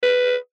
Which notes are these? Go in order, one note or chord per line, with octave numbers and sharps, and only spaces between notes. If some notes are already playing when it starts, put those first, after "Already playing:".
B4